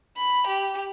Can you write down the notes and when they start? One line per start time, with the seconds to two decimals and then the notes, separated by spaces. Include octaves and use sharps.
0.17 B5
0.48 G4